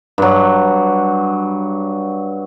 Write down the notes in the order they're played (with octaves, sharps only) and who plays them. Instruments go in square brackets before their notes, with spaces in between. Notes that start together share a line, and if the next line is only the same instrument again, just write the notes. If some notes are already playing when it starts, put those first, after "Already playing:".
[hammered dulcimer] G2 F#3